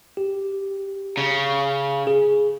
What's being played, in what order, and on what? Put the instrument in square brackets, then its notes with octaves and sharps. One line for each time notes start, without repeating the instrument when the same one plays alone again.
[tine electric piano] G4
[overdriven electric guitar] C#3
[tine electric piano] G#4